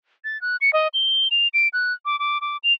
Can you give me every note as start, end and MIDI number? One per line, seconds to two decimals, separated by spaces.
0.24 0.40 93
0.41 0.56 90
0.61 0.73 97
0.73 0.88 75
0.94 1.28 103
1.31 1.48 101
1.54 1.68 98
1.73 1.93 90
2.05 2.19 86
2.19 2.41 86
2.41 2.57 86
2.64 2.73 101